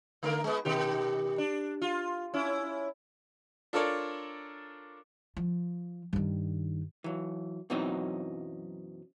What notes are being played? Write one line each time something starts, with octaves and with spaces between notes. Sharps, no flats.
D3 A3 A#4
G#3 B3
B2 D#3 G4
D4
F4
C#4 E4
D4 F4 A4 A#4 C#5 D5
F3
G2 D#3
E3 F#3
F#2 B2 E3 F#3 C4 D#4